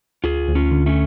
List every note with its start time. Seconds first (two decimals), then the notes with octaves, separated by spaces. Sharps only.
0.24 D2 F4 G#4
0.48 D2
0.55 C#4 F4
0.71 D3
0.86 A3 C#4